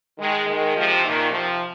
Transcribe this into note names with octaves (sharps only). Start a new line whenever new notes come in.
D#3 G#3
D#3 G#3
C3 F3
A#2 D#3
C3 F3